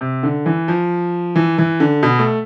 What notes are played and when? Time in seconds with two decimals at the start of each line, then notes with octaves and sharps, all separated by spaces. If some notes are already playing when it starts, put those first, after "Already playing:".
0.01 C3
0.23 D3
0.46 E3
0.68 F3
1.36 E3
1.58 E3
1.80 D3
2.03 B2
2.19 A3